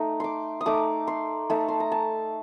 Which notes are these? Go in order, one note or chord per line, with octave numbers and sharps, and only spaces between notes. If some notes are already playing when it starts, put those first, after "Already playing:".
Already playing: A3 D#4
C6 D6
D#6
A3 D#4 D6
C6
A3 D#4 A5
C6
A#5
A5